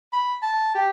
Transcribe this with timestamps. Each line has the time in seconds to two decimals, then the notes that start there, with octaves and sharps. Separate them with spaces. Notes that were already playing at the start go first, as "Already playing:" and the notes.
0.13 B5
0.43 A5
0.75 G4